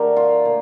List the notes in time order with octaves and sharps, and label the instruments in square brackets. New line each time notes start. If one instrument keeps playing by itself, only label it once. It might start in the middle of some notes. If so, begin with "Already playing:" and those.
Already playing: [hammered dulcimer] D3 A3 G4 A#4 D5
F4
A#2